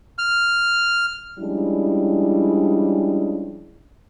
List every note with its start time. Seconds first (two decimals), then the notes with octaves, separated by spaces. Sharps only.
0.18 F6
1.39 F3 G3 G#3 C#4 D4 E4